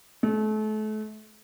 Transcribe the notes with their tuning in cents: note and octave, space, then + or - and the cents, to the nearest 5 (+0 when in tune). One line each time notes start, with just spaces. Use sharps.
A3 -35